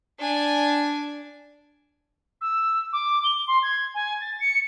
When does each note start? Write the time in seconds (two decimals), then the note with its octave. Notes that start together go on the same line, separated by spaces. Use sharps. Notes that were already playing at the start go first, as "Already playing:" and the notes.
0.19 D4 G#5
2.41 E6
2.93 D6
3.24 G7
3.48 C6
3.63 G#6
3.94 G#5
4.21 A6
4.40 C#7